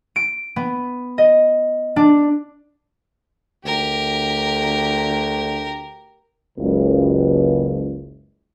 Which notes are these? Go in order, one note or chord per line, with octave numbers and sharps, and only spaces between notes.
D7
B3
D#5
D4
D2 G4 A#4
F#1 C#2